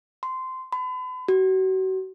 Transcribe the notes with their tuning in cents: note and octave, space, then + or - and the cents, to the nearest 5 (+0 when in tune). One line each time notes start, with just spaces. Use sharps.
C6 -15
B5 +40
F#4 +35